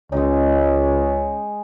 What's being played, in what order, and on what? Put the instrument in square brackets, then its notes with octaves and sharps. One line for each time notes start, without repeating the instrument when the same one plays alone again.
[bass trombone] C#2 [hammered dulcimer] G#3 D#4 [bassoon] C#4